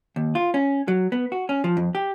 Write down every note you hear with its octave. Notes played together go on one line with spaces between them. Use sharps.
D#2
F4
C#4
F#3
B3
F#4
C#4
F3
F2
G4